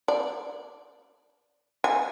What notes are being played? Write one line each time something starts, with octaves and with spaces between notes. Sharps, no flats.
D5
G#5